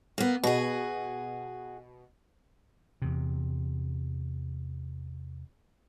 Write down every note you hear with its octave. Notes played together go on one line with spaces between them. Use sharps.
A#3 B3
B2 F#4 G#4
E2 C3